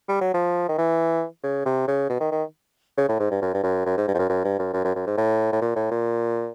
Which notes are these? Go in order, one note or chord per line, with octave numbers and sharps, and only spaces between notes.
G3
F#3
F3
D#3
E3
C#3
C3
C#3
B2
D#3
D#3
C#3
A2
G#2
G2
F#2
G2
F#2
F#2
G#2
G2
F2
F#2
F#2
G2
F#2
F#2
F#2
F#2
G#2
A2
A2
A#2
A2
A#2